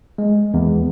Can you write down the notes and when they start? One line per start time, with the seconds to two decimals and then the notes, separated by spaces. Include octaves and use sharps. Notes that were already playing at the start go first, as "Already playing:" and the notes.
0.18 G#3
0.54 E2